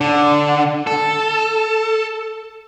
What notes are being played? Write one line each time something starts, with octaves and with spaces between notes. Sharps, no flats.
D3
A4